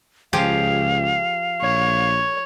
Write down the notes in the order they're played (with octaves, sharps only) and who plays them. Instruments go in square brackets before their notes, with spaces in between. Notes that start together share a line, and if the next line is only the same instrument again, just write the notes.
[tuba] C#2 [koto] F3 G4 G#4 [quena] F5
[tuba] A#1 [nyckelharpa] C#5